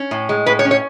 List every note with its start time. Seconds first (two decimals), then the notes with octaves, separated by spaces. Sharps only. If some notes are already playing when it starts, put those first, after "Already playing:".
Already playing: C#4
0.11 A2
0.29 G#3
0.46 A2 B4
0.59 C#5
0.65 C#4
0.71 C#5